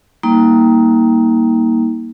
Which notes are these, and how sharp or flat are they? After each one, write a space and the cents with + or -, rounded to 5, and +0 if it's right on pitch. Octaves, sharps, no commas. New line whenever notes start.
G3 +0 A#3 +0 D#4 +25